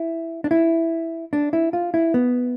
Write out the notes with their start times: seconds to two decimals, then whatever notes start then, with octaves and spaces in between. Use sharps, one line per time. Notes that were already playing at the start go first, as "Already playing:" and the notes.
Already playing: E4
0.44 D4
0.51 E4
1.33 D4
1.53 E4
1.73 F4
1.94 E4
2.14 B3